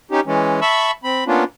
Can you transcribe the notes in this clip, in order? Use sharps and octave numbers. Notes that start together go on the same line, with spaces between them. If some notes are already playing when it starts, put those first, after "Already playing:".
C#4 D#4 G4
E3 G#3 C#4
E5 A5 B5 C#6 E6
C4 B5
A#3 B3 C#4 D4 F4